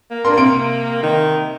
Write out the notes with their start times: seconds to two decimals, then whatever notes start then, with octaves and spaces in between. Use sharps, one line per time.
0.11 A#3
0.25 D4 A#4 C6
0.37 C3 C6 D7
1.03 D#3